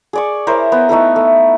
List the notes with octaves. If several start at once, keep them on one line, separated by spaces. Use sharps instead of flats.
G#4 D5 C#6
E4 A#4 C5 C#5
B3
A3 D#4 E4 A4
A3